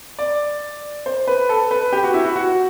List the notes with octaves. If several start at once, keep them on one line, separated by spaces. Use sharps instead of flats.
D5
C5
B4
A4
B4
G4
F#4
E4
F#4
F#4